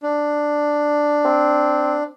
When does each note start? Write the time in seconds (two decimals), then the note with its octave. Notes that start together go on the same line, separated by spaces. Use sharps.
0.03 D4
1.25 C4